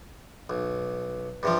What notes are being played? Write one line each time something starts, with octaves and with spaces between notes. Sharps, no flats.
B1
G2 C3 F3